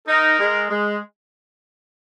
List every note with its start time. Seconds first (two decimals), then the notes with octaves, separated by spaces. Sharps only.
0.07 D#4 A#4
0.38 G#3
0.69 G#3